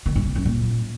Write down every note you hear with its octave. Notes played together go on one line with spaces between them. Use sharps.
D#3
G2
C3
F#2
A#2